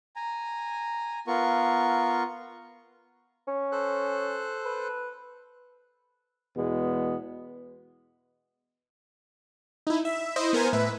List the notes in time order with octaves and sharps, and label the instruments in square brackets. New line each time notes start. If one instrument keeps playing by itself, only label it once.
[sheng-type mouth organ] G#5 A#5
B3 F4 A#4 C#6
[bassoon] C#4
[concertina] A4 C5 F#6
[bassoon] B4
[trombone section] E2 B2 G#3 B3
[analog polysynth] D#4 E4
E5
E4 C5 D#5
B3 A#4 C5 G#5
A2 B4 E5